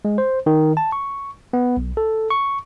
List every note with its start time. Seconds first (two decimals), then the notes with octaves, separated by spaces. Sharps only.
0.05 G#3
0.18 C5
0.46 D#3
0.77 A5
0.92 C#6
1.53 B3
1.77 B1
1.97 A4
2.30 C#6